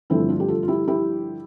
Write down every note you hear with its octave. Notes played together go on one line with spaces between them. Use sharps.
G2 D3 F3 A3 C4 E4
D4 F4
G4
F4 A4
F4
E4 G4
E4 G4